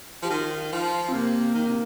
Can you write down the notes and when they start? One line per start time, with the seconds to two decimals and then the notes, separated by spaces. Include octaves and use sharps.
0.23 F3 G4
0.30 D#3 F4
0.73 F3 F4
1.08 C4
1.13 C3 A#3
1.55 D#3
1.67 C3